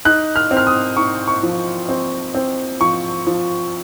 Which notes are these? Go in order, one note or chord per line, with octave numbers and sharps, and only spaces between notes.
D#4 F#6
F6
C4
F6
D#6
D#4 C#6
C#6
F3
C4
C4
F3 C#6
F3